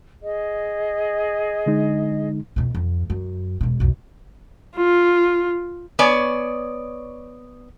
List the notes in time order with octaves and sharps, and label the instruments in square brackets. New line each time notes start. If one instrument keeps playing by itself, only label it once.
[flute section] G#4 D#5
[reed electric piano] D3 G#3 D#4
[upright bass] F2 B2
F2
F#2
E1 B2
B1 F2
[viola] F4
[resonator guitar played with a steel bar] B3 C#5 D5 G#5